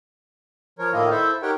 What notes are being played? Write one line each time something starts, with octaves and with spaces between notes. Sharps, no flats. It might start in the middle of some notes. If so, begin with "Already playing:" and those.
F3 A#4 C#5
A2 D#3 A#3 E4 F4 D#5
E4 A4 C5 E5
D#4 G4 A#4 C#5 F#5 G5